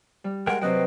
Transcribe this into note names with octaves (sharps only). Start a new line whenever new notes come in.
G3
G#3 A#4 F#5 G5
C3 F#3 C4 B4 D#5 G5